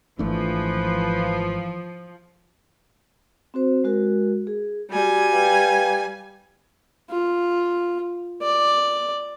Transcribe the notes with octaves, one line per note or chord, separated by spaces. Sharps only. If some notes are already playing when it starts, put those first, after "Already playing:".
G#1 E3 F3 A3 D4 B4
C4 F#4 C5
G#3 F#4 A#4
G#4
G3 F#4 G#5
B4 F5 G5
F4
D5